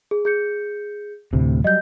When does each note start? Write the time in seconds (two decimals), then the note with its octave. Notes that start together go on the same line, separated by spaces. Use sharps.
0.11 G#4
0.25 G#4 G6 C#7
1.33 D2 A2 C3
1.64 F#3 G3 D#5 G6